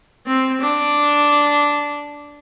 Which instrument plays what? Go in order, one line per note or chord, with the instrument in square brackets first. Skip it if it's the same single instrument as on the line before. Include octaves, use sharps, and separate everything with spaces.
[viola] C4
D4